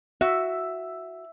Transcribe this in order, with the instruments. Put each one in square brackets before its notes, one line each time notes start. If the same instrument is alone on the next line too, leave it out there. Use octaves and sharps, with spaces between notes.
[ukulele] F#4 [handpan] E5